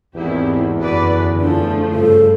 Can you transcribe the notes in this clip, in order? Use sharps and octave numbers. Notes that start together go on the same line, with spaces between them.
G#1 E2 G#2 D#3 C4 E4 G4
F#2 D3 F#4 B4 D5
F3 A3 D4
G2 C#3 A4